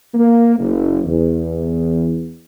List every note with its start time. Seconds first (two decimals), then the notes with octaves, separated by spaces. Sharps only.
0.14 A#3
0.58 F#1
1.05 E2